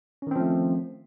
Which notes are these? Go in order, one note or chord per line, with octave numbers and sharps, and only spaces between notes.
D#3 F3 A3 C4 C#4